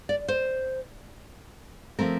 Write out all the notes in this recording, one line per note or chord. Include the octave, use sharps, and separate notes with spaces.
D5
C5
F3 A3 C4 A#4